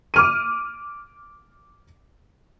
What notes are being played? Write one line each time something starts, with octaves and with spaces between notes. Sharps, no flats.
D6 F6 D#7